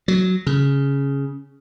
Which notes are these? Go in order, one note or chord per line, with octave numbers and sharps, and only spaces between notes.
F#3
C#3